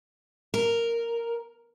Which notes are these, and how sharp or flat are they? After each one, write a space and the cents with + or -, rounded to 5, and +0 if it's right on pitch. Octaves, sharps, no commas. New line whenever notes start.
A#4 -5